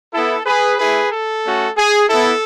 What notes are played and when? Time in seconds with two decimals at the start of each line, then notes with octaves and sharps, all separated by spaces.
0.14 B3 E4 A4
0.46 G#4 B4
0.79 A3 E4 G#4 B4
1.12 A4
1.44 A3 C#4 F#4
1.76 G#4
2.09 B3 E4 A4